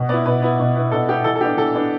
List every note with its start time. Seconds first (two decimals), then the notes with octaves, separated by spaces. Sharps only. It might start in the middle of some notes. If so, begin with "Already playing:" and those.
Already playing: B2
0.09 B3 D5
0.13 E4
0.25 B2 B4
0.42 B3 E4
0.60 B2
0.76 B3 E4
0.92 B2 A4
1.08 B3 E4 G4
1.24 E3 A4
1.35 A4
1.41 B3 D4 G4
1.57 E3 A4
1.74 B3 D4